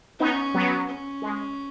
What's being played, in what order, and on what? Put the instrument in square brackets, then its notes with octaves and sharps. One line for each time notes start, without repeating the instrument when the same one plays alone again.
[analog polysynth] B3 D#4 [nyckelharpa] C#4
[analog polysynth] F#3 B3
[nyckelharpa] C#4
[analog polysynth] G#3